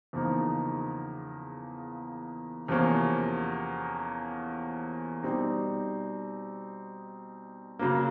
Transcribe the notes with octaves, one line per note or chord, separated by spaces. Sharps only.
E2 C#3 F3 A#3 D#4
E2 C3 F3 A#3 C#4
B2 G3 C4 D#4
C#3 F#3 A#3